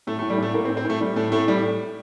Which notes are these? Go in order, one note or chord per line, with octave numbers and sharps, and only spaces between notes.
A2 A3
A2 A3
G3
A2 A3
A2 A#3
C4
A2
C4
A2 A3
A2 G3
A2 A3
A2 A3
A2 G3